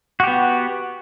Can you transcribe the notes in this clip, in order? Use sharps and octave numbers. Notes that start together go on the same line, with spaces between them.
B3 F#4 G4